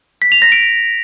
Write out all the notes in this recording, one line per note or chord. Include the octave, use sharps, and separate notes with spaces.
B6
F7
A#6
D7